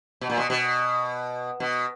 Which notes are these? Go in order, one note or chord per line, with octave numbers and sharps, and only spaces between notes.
B2
A#2
B2
B2
B2